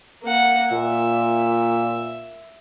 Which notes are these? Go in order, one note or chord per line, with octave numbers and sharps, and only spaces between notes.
A#3 F#5
A#2 E5